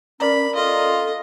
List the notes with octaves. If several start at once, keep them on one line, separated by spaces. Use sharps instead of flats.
C#4 A#4 D5 A#5 B5
F4 A4 D#5